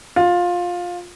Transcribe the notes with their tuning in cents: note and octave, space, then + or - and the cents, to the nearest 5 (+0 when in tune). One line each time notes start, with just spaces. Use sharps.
F4 +15